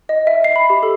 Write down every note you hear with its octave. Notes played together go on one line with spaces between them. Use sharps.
D#5
E5
C7
B5
G4
A4